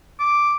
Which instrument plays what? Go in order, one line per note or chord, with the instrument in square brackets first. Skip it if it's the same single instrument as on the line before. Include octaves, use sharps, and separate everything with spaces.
[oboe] D6